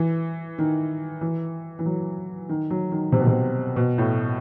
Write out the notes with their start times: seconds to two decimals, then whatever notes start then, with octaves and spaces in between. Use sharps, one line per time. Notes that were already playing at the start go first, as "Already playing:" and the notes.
Already playing: E3
0.58 D#3
1.21 E3
1.79 E3
1.86 F#3
2.49 D#3
2.70 F#3
2.92 D#3
3.12 C3
3.20 B2
3.27 C3
3.76 B2
3.98 A2